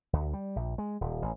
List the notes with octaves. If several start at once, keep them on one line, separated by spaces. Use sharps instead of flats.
D2
G3
A#1
G#3
D#1
A1